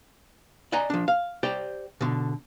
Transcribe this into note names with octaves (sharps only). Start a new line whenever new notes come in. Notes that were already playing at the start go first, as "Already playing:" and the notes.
D5 D#5 F#5 G#5 A#5
F3 D4
F5
G4 C5 D5 G5
B2 D3